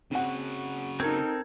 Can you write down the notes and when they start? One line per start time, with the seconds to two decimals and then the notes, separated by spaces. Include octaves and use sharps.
0.11 C#3 C4 F#4 F#5
1.00 C4 D#4 A4 A#4 G#6